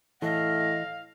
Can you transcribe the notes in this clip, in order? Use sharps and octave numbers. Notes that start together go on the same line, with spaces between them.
A2 E3 D#5 F5